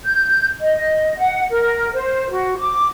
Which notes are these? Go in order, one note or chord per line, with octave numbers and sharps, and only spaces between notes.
G6
D#5
F#5
A#4
C5
F#4
D6